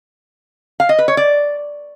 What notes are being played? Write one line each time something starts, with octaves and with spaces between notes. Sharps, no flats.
F5
D#5
B4
C#5
D5